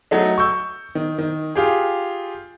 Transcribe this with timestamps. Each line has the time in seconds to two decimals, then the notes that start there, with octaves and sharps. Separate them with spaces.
0.11 F#3 A3 D#4
0.38 C#6 E6 G6
0.95 D#3
1.18 D#3
1.55 F4 G4 G#4